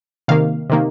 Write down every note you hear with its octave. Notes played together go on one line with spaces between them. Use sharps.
C3 D#3 A#3 F5
C3 D#3 A#3